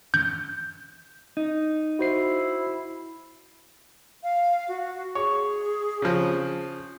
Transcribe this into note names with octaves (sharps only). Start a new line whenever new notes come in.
G6
D#4
E4 F#4 C5 C7
F5
F#4
G#4 C#5
C#3 F3